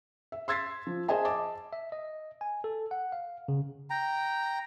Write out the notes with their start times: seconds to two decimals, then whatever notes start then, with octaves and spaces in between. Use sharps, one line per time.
0.32 E5
0.48 C6 E6 G#6 A6 B6 C7
0.87 F3
1.08 G#4 C5 D#5 E5 G#5 A5
1.25 D#5 A5 D6
1.73 E5
1.92 D#5
2.41 G#5
2.64 A4
2.91 F#5
3.12 F5
3.48 C#3
3.90 G5 A#5